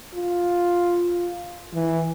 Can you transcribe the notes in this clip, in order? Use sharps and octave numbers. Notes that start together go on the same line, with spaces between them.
F4
E3